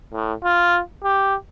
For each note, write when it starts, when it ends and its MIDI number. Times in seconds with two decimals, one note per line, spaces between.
0.12 0.34 45
0.44 0.80 65
1.04 1.35 67